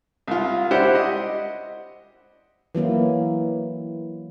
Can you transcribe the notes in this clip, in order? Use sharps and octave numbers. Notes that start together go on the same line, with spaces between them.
C2 F4
D4 E4 G4 C5 F#5
D#5
E3 F#3 A#3 E4